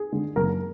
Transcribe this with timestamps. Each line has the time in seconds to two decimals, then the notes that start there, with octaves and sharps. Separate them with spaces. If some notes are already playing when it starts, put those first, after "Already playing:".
Already playing: G#4
0.12 D3 G#3
0.36 F#1 A#4